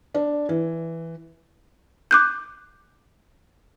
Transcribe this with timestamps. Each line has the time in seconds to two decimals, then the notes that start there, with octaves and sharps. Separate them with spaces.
0.15 D4
0.49 E3
2.11 D6 F#6 G6